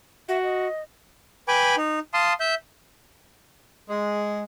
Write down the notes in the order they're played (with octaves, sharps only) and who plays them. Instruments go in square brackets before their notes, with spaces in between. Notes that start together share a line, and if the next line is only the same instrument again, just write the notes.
[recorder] F#4 [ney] E5
[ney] D#5
[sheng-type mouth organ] B4 G5 G#5 B5 D6
D#4
F5 A5 C6 D#6
E5 G6
[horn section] G#3